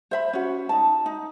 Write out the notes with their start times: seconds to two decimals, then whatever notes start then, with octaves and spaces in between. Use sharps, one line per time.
0.11 C5 E5 B5
0.33 C#4 F#4
0.69 D#4 A5
1.06 D#4